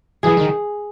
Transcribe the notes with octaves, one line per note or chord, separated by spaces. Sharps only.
E3 G#4
D#3